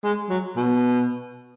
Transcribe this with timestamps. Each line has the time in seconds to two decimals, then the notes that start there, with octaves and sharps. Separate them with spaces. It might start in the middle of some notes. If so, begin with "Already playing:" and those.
0.04 G#3
0.30 F#3
0.56 B2